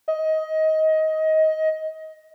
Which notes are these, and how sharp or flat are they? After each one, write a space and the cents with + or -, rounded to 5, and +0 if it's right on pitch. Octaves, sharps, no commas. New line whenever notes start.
D#5 +20